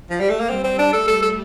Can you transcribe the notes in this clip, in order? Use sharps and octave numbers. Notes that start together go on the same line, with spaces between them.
F3
G3
A3
A#3
G3 C4
C4
D4
A3 A4
A4
A4